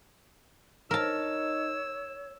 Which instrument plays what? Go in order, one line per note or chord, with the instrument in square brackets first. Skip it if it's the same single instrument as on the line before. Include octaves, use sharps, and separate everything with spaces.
[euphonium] D#4 [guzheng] A#4 A5 [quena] C#5 [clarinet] E6